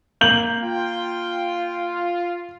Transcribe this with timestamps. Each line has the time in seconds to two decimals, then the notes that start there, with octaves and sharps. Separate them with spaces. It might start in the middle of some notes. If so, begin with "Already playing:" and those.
0.21 A#3 G6 F#7
0.63 F4 G5